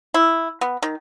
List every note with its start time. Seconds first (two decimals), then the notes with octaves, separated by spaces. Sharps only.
0.14 E4
0.61 B3
0.82 D#3